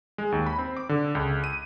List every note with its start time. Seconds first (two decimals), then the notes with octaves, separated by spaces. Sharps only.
0.18 G#3
0.32 D#2
0.46 B5
0.58 C4
0.77 D6
0.89 D3
1.15 C#2
1.44 D#7